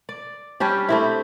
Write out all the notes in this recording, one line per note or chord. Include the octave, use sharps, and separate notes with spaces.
D5
G3 C#4 D4 G4
A3 C4 E4